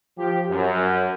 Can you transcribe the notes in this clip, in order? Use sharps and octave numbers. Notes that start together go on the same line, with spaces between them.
F3 G4
F#2